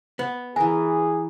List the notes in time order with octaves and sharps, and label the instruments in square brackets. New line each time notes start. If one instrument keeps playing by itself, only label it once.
[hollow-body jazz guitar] B3
[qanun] E3 A#4 [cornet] G#4 [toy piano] G#5